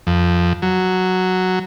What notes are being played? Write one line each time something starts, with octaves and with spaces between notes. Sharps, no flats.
F2
F#3